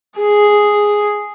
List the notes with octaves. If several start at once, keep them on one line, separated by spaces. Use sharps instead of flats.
G#4